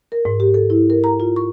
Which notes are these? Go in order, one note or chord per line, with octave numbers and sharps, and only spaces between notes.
A#4
G#2
G4
A4
E4
A#4
A#5
F4
C#6